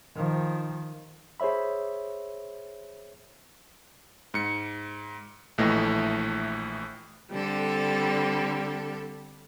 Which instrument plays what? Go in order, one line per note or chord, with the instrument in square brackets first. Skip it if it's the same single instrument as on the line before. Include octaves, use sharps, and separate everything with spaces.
[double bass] D#3 F3
[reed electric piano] G#4 C5 C#5 E5 B5
[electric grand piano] G#2 C#7
A#1 A2 E3 A3 D#5
[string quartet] D3 G3 C4 A4